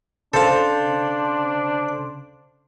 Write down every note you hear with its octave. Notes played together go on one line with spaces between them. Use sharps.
C#3 D4 A4 C5 F5 A5